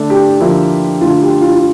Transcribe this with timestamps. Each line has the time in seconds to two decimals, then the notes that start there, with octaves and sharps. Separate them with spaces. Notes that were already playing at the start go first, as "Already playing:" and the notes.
Already playing: D3 A3 D4
0.10 G4
0.40 D3 F3 A#3 E4
1.01 D3 A3 E4 F4
1.21 G4
1.41 F4
1.53 F4